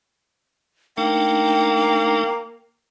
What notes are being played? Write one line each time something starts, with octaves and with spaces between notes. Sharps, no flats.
A3 A#3 D4 D#4 G5